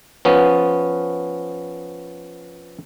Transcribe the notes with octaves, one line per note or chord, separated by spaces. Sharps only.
F3 B3 C#4